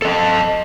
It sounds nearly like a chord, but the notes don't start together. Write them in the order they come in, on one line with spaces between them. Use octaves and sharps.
A4 D#5 A5